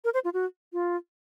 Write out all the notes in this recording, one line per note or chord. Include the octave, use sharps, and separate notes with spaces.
A#4
C5
F4
F#4
F4